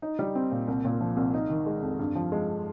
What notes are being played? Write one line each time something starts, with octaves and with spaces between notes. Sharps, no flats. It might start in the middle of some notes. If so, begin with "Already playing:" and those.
D#4
G3
C4
A#2
C2
A#2
F3
C2
D#4
D#3
G#3
F2
G2
F3
G#3